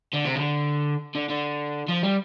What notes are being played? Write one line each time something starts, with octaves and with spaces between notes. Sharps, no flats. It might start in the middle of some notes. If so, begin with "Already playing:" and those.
D3
C3
D3
D3
D3
F3
G3